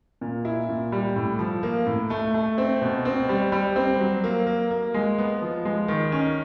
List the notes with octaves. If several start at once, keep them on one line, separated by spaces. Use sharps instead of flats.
A#2
E4
A#2
G3
A2
F3
A#3
A2
A3
A3
C4
B2
C4
G3
G3
C4
F#3
A#3
A#3
A#3
G#3
B3
F3
G#3
D#3
C#4